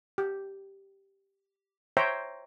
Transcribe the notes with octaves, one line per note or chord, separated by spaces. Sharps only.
G4
C5 C#5 E5 G5 A#5